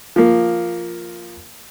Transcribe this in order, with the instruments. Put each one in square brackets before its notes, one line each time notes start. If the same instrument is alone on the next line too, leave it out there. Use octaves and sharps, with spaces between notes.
[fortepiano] F3 A#3